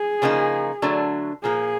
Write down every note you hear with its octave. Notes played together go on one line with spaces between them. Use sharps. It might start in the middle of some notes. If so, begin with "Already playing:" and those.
Already playing: G#4
C#3 F3 A#3 D#4
D3 F#3 A3 D4
A#2 F3 A#3 G#4